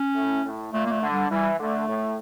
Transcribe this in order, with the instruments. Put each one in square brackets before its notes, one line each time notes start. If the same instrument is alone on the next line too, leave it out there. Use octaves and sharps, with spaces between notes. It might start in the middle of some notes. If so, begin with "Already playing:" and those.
Already playing: [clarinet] C#4
[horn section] A2
A2
[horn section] A#2 [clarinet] A3
[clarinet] A#3
A3
[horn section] D3
[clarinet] G3
[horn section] E3 [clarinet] G3
[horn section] D3 [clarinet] A3
[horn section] A2